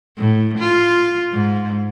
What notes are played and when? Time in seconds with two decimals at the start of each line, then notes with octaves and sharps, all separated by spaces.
0.18 A2
0.58 F4
1.32 G#2